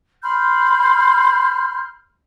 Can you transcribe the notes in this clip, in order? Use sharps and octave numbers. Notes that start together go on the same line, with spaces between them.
B5 C6 F6 G6